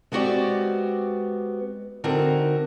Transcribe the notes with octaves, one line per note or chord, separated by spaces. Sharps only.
G#3 B3 C4 F#4 G4 D5
D3 C4 D#4 F#4 A#4